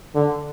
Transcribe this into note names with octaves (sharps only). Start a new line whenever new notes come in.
D3